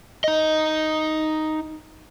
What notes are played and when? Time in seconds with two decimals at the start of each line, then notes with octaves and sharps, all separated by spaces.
0.24 D#4 D#5